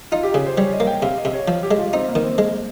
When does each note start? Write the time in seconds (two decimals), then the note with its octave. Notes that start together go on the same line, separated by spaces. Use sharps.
0.12 D#4 F4
0.23 G4
0.34 C#3 G#4
0.46 C5
0.57 G3 C#5
0.73 D#5
0.80 A#3
0.87 G5
1.02 C3 F5
1.18 D#5
1.25 C3
1.33 C#5
1.48 F3
1.63 G4
1.71 G#3
1.78 F4
1.93 C4 D#4
2.08 A#3
2.15 D#3
2.24 C4
2.38 G#3